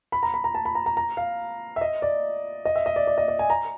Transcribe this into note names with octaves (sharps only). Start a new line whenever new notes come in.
B5
A#5
B5
A#5
A5
B5
A#5
A#5
A#5
F5
E5
D#5
D5
D#5
E5
D#5
D5
D5
D#5
D5
G#5
A#5